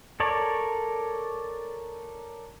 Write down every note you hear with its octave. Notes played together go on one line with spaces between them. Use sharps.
A4 A#4 C#5 D5